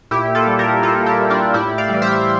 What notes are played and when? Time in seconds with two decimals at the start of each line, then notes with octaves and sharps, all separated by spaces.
0.11 A#2 E4 G4
0.35 F4 A4
0.47 G3
0.59 G4 A#4
0.83 A#2 F4 A4
1.06 E4 G4
1.18 G3
1.30 D4 F4
1.54 A2 E4 G4
1.78 D5 F5
1.89 E3 G3
2.02 C5 E5